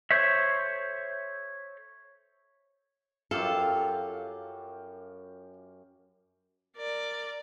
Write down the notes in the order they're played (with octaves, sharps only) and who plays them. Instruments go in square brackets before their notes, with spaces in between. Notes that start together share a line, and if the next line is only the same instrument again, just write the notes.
[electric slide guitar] A4 C5 C#5 E5
[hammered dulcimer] F#2 G4 F5 [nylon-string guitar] F4 A4
[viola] A#4 D5